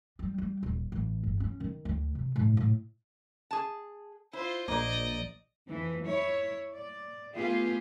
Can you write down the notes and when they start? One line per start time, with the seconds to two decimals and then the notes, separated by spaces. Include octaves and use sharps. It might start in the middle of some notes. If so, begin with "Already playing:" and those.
0.19 G3
0.38 G3
0.63 D#1
0.92 A1
1.23 G1
1.40 C#4
1.60 D#3
1.85 D2
2.15 C3
2.36 A2
2.57 A2
3.51 G#4 A5
4.33 E4 F4 C5
4.68 A#1 A#3 C5 D5 D#5
5.68 F2 E3
6.06 E4 C#5
6.73 D5
7.35 A3 B3 F4 G4 G#4